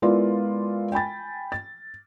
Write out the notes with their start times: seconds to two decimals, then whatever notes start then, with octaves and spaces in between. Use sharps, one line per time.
0.02 G#3 B3 E4 F4 A#4 D5
0.92 G5 G#5 B5 A6
1.52 A6